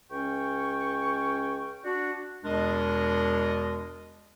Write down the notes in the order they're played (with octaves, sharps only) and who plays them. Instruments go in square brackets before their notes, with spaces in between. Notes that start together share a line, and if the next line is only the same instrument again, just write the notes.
[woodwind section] C#2 C#4 G5 C#6
D4 F#4
E2 B2 G#3 D4 A#4 D#5